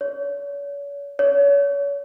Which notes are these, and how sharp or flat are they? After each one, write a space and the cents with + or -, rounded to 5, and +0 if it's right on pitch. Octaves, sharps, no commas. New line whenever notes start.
C#5 +40
C#5 +35